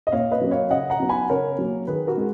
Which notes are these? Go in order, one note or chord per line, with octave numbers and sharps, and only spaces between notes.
D#5
A#2 C#5 F5
B4 D#5
F#3 A#3 C#4
C#5 F5
C#3 D#5 F#5
F#5 A#5
F#3 B3 D#4
G#5 B5
C#3 A#4 C#5
F#3 A#3
D#3 G#4 B4
F#4 A#4
G#3